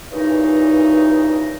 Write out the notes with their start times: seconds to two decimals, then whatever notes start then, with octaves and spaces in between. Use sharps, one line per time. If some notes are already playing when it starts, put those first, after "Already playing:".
0.12 G2 A#2 C#3 E3 D#4